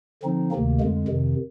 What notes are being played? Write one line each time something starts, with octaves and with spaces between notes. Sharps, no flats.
D3 F3 C4 D#4
D2 C3 D#3 A#3
F2 D3 G#3
F2 C3 D#3